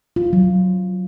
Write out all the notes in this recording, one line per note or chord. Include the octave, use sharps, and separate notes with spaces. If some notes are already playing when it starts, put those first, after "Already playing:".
F4
F#3